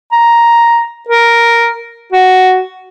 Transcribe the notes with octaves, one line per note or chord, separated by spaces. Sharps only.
A#5
A#4
F#4